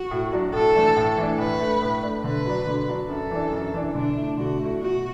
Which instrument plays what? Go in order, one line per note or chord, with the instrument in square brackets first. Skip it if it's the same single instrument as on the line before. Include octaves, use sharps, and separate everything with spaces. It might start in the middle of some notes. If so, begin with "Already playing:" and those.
Already playing: [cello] F#4
[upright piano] A2
F#3 D4
[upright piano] A2 [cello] A4
[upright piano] E3 A3 D4
A2
E3 A3 D4
[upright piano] A2 [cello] B4
[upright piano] A3 D4
A2
A3 D4
[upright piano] D3 [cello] B4
[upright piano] F#3 D4
D3
F#3 D4
[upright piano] F#2 [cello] A4
[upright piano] E3 D4
F#2
E3 D4
[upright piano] D3 [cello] D4
[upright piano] A3 E4
[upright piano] D3 [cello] F#4
[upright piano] A3 E4
[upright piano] B2 [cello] F#4